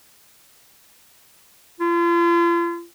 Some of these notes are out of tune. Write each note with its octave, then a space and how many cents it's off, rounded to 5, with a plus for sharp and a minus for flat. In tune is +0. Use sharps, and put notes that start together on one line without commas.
F4 -40